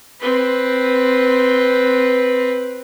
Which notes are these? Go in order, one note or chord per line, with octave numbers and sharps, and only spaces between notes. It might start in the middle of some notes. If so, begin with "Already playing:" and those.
C4 B4